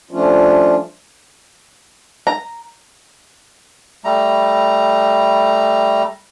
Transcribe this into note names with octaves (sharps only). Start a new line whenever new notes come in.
F3 G3 A3 C#4 D4 F4
A#5
G3 A3 A#5